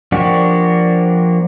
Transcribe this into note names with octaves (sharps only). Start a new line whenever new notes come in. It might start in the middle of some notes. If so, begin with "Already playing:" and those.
F3 A#3 D4 F#4 G4